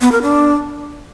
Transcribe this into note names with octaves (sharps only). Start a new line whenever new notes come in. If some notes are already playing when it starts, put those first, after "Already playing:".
B3
A#4
D4